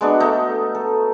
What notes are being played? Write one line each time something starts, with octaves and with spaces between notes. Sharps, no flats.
G#3 B3 D4 F#4
A3 D#4
A4